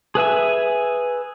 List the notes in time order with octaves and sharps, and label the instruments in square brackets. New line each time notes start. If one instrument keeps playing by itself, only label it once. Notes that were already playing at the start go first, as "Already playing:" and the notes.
[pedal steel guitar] G#4 B4 E5 G#5